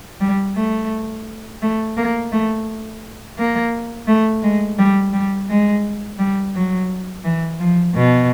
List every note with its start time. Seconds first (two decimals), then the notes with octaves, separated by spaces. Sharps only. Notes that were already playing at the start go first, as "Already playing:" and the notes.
0.21 G3
0.56 A3
1.62 A3
1.97 A#3
2.32 A3
3.38 A#3
4.07 A3
4.43 G#3
4.78 G3
5.13 G3
5.49 G#3
6.19 G3
6.55 F#3
7.24 E3
7.59 F3
7.95 B2